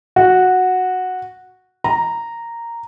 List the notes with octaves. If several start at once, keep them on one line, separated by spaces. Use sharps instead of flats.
F#4
A#5